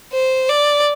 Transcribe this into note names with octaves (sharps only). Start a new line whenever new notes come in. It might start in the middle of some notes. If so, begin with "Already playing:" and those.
C5
D5